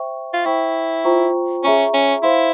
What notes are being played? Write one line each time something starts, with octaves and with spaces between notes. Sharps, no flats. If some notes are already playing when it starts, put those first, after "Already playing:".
Already playing: C5 E5 G5 C#6
F4
E4 C5 G5 C#6
F4 C5 G5 A#5 C#6
C#4 G#4 E5 A#5 C#6
C#4
E4 C5 F5 C6